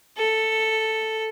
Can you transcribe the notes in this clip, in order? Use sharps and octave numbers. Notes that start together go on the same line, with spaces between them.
A4